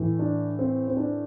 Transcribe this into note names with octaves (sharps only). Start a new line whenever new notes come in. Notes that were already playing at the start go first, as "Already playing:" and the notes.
Already playing: A2 E3
D4
C4
C4
D4